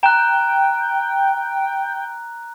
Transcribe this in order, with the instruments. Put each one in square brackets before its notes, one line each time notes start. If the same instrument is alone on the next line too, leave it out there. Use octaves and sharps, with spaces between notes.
[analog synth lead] G5 [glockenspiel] A#5 F#6